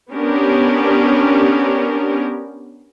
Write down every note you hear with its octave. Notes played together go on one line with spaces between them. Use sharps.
B3 C#4 D4 G4 A#4